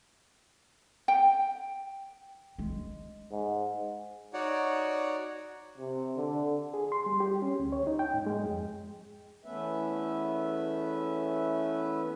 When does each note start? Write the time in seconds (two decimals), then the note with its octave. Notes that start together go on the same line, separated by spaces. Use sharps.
1.08 G5
2.58 G#3
3.31 G#2
4.33 D#4 F#4 C#5 D5 F#5
5.78 C3
6.16 D3
6.74 G#4
6.92 C6
7.06 G3
7.20 G4
7.42 C#4
7.60 D2
7.72 C#5
7.87 D#4
7.99 G5
8.14 G#2
8.27 G#3
8.45 F2
9.44 E2 A3 B3 C#4 B4 E5